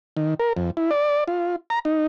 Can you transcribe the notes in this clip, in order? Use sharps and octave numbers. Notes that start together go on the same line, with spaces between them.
D#3
A#4
F2
E4
D5
F4
A#5
D#4